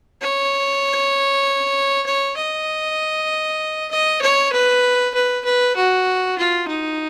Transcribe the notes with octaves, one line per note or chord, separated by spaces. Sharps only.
C#5
C#5
D#5
D#5
C#5
B4
B4
B4
F#4
F4
D#4